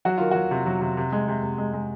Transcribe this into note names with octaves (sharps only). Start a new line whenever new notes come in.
F#3 F#4
D#3 F4
F#3 F#4
C3
F#3
C3
C3
G#3
C3
C3
G#3
G#3